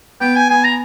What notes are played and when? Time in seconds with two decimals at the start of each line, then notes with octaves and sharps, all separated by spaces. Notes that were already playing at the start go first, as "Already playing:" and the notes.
0.20 B3 G5
0.36 G#5
0.50 B3 G#5
0.64 A#5